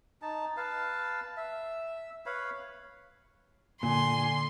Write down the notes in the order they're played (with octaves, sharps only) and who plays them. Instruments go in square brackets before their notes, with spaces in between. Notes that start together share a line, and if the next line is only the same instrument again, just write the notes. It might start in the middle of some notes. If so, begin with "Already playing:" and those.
[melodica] D#4 A5
B4 F5 A5
E5
B4 C#5 F5 B5
[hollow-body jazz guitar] A#2 [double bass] D3 [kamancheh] G#5 [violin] C6